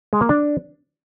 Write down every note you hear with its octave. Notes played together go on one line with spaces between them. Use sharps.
G#3
A#3
D4